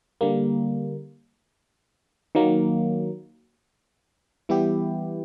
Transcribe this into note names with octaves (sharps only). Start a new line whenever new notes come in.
D3 G3 A#3
D#3 F#3 A#3
E3 G3 B3 E4 G4